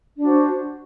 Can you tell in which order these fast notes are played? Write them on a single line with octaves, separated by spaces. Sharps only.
D4 F#4 C5